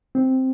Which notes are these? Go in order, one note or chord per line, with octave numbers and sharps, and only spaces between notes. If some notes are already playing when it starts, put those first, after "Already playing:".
C4